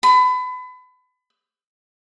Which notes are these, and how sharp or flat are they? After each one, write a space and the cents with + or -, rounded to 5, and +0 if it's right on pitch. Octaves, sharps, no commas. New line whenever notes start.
B5 +30